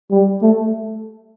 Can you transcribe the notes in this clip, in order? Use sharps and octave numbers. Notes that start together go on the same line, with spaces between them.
G3
A3